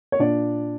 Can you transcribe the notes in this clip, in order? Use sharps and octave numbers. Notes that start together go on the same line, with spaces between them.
C#5
A#2 D4 D5